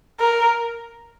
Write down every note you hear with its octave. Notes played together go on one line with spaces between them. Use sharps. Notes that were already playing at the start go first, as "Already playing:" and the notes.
A#4